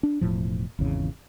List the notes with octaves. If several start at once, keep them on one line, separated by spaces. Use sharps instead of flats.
D4
E1 A2 F3
G#1 E2 C#3